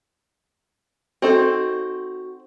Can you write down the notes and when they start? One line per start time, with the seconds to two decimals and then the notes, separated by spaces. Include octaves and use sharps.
1.22 C4 D#4 F#4 A4